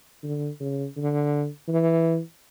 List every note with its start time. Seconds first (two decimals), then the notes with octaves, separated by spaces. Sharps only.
0.23 D3
0.60 C#3
0.97 D3
1.68 E3